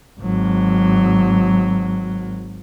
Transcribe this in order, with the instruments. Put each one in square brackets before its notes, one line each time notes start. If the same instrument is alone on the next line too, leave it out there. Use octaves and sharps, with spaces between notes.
[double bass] G#1 F#3